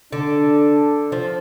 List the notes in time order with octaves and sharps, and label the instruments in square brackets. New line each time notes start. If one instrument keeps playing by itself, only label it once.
[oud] D3 [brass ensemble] D4
[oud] F3